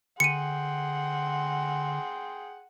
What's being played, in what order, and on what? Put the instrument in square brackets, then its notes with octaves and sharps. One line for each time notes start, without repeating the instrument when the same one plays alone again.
[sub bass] D3 [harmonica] G#4 G5 C6 [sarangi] F#5 [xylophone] C#7 D#7